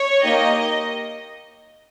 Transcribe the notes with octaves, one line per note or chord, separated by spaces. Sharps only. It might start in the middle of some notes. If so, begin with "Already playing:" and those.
Already playing: C#5
A#3 D#4 G4 D#5